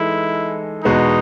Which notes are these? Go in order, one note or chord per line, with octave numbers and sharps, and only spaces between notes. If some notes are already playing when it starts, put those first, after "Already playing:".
Already playing: E3 G#3 D#4 E4 A4
E2 B2 G#3 B3 D#4 F#4